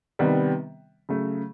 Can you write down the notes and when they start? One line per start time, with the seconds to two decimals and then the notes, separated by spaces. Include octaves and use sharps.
0.19 C3 D#3 G3 B3
1.09 C#3 F#3 A3